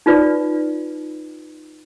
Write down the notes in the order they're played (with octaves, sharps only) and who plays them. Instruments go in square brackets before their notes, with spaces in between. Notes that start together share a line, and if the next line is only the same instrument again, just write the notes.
[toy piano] D#4 F4 B4 D5